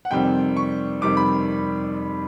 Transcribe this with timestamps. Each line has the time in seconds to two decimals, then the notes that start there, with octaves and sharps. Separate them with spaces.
0.05 F#5
0.11 F2 C3 D#3 G3 C4 G5
0.57 C#6
1.01 F2 C3 D#3 G3 C4 D6
1.17 B5